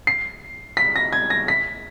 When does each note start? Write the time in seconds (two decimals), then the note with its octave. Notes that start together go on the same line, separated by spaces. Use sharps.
0.07 C7
0.77 B6
0.96 A#6
1.13 G#6
1.30 A#6
1.48 B6